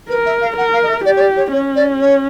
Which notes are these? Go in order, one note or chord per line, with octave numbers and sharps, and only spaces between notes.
A#4 B4
E5
F5
A#4 F#5
F5
D#5
E5
G4 D5
C#5
D5
C#5
C#4 C#5
D5
C#5